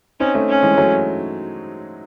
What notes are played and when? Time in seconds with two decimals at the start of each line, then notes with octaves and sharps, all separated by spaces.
0.20 C4 C#4 D#4
0.35 A3 C#4
0.49 C#4
0.62 E3 G#3
0.77 F#3 A3